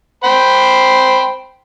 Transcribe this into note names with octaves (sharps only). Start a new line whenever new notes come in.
C5 G5 B5